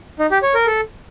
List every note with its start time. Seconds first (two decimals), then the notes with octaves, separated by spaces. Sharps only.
0.19 D#4
0.31 G4
0.43 C#5
0.54 A#4
0.66 A4